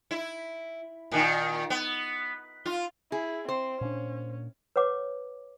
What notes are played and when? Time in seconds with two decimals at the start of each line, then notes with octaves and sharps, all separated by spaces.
0.11 E4
1.12 A#2 D#3
1.70 B3
2.65 F4
3.12 E4 G#4
3.49 C4 C5
3.81 A#2 C#4 D4
4.76 B4 C#5 F#5 D6